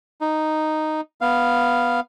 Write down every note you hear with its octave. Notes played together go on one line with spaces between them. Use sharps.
D#4
B3 F5